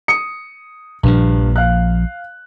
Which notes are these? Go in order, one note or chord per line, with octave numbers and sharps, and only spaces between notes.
D#6 C#7
A#1 G2 A#2 F3
F5 F#6